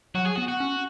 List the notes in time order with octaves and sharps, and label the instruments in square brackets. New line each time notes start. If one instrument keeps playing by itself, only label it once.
[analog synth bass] F#3 [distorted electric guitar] F#4
[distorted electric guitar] G#4
[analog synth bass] B3 [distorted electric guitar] F#4
[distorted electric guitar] F#4
[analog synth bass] C#4